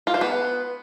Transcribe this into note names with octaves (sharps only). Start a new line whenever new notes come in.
F4
C5
B3